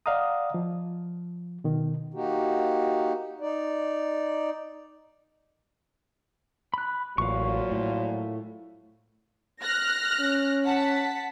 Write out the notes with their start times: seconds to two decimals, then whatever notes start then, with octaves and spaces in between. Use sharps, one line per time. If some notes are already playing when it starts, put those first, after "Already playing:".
0.06 D5 D#5 F5 F#5 A#5 D#6
0.54 F3
1.64 B2 D#3
2.12 A#3 D#4 F#4 G4
3.41 D#4 D5
6.74 B5 F#6
7.18 A1 A#2 F3 F#3 F5 C#6
7.72 A2
9.62 F6 F#6 A#6
10.20 C#4
10.66 F#5 A5 B6